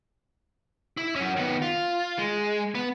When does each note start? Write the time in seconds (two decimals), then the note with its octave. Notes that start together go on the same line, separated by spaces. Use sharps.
0.97 E4
1.16 F#3 C#4
1.37 D#3 B3
1.62 F4
2.18 G#3
2.75 B3